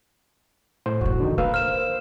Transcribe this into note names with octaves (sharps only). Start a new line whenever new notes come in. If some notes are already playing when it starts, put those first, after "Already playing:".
A2 C5
F2 A#2 F#4
D3 D#3 D#4
A#3 A#4 B4 F5 E6
C5 F6 E7